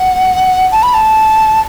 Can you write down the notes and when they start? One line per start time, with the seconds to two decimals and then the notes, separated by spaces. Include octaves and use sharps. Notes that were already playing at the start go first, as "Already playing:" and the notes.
Already playing: F#5
0.72 A5
0.83 B5
0.94 A5